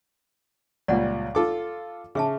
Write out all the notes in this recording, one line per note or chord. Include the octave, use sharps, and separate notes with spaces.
C#2 A#2 G3 D5 F#5
F4 A4 D6
C#3 G#4 E5 A5